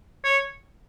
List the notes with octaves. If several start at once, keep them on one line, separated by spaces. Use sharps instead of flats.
C#5